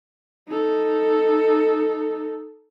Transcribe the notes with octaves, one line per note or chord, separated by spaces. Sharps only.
D#4 A4